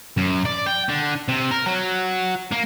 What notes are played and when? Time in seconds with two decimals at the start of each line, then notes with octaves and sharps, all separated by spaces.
0.17 F#2
0.45 D5
0.66 G5
0.89 D3
1.29 C3
1.51 A#4
1.66 F#3
2.51 A#3